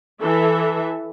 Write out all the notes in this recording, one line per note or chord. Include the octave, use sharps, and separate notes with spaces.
E3 A4 E5